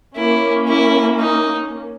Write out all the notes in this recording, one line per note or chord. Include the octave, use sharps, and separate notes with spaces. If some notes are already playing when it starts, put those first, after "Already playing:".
A#3 C#4 E4
E4
D#4